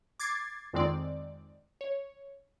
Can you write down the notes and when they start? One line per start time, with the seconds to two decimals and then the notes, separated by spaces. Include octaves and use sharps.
0.20 D6 G#6 A6 C7
0.73 F2 D#3 G#3 C4 D5
1.81 C#5